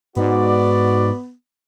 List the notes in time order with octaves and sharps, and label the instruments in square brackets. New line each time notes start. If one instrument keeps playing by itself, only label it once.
[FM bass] G#2 [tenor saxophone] B3 [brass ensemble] F#4 D5